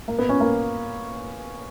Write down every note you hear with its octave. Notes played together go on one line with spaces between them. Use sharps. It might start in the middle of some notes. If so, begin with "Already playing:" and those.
A#3
B3
C#4
A#3